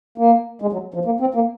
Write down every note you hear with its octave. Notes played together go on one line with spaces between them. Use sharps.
A#3
G#3
F#3
F3
A#3
C4
A#3